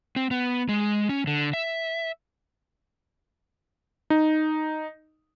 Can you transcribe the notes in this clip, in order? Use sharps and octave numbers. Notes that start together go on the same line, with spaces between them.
C4
B3
G#3
C#4
D3
E5
D#4